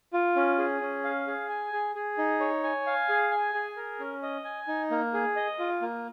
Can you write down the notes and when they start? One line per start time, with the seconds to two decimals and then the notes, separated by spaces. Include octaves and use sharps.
0.13 F4
0.36 C#4
0.58 G#4
0.81 C#4
1.04 F5
1.27 G#4
1.49 G#5
1.73 G#4
1.95 G#4
2.18 D#4
2.40 C#5
2.64 G#5
2.87 F5
3.09 G#4
3.31 G#5
3.54 G#4
3.76 A#4
4.00 C#4
4.22 D#5
4.45 G#5
4.68 D#4
4.91 A#3
5.14 G#4
5.36 D#5
5.59 F4
5.82 A#3